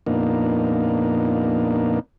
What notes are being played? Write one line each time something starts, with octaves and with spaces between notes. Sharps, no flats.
F2 A#2 A#3 B3 D4 D#4